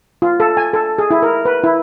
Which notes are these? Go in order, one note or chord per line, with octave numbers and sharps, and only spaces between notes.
F4
A4
G#5
A4
G#4
E4
A#4
B4
E4